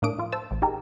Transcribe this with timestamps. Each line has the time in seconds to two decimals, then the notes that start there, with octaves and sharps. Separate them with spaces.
0.02 A2 A#3 D4 D#6 D7
0.18 F3 F4
0.32 C5 A5 E6
0.51 A1
0.62 D#4 G4 G#4 A#4